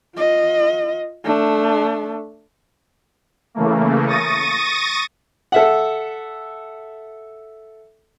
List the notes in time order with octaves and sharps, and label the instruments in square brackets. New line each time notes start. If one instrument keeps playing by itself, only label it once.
[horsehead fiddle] F4 D#5
A3 D4
[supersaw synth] C#3 E3 A3 A#3
C#6 D#6 A6 A#6 D#7
[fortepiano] A4 E5 F#5